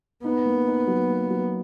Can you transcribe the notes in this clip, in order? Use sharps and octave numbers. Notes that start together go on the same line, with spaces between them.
B3 D#4
A#3
D#4
F#3
A#3
F#3